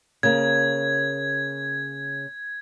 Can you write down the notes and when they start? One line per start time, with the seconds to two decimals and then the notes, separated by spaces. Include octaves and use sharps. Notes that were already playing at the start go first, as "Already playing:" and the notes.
0.23 C#3 A#3 G#6